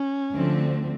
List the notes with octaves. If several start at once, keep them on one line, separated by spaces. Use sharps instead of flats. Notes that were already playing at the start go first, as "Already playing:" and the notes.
Already playing: C#4
D2 D3 F3 A3 C4